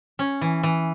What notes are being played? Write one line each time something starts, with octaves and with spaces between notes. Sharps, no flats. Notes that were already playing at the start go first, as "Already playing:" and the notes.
C#4
E3
E3